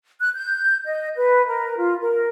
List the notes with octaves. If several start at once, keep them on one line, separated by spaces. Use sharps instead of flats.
F#6
G6
D#5
B4
A#4
F4
A#4